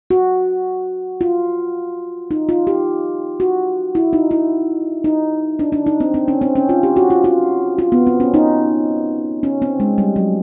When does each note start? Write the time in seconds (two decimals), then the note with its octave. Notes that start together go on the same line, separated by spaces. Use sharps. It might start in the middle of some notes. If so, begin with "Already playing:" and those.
0.11 F#4
1.21 F4
2.31 D#4
2.49 F4
2.67 G4
3.40 F#4
3.95 E4
4.13 D#4
4.31 E4
5.04 D#4
5.59 D4
5.72 D4
5.87 D#4
6.00 C4
6.14 C4
6.28 C#4
6.41 C4
6.56 C#4
6.69 F4
6.83 G4
6.97 F#4
7.10 F4
7.24 F4
7.79 F4
7.92 B3
8.07 C4
8.20 C#4
8.34 D#4
9.43 C#4
9.62 C4
9.80 G#3
9.98 G3
10.16 F#3